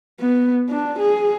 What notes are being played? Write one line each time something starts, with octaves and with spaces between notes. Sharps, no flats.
B3
D4
G#4